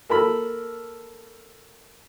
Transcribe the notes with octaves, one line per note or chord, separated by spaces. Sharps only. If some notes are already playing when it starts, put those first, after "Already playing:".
A#3 A4 A#4 B5